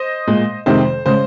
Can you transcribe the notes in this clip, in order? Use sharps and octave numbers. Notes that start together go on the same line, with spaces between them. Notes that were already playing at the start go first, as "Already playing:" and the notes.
Already playing: C5 D#5
A#2 G#3
F2 C3 D#3 G#3 C5
C#3 G#3 C5